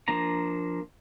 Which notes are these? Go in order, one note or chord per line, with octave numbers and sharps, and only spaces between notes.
F3 A#3 D4 A#5